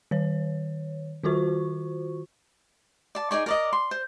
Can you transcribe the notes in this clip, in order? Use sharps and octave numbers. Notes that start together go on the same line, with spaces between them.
D#3 C#5
D#3 F4 F#4 C5 C#6
D5 A5
D#4 G#4 D5 C#6
A#4 D5 D#5
C6
C5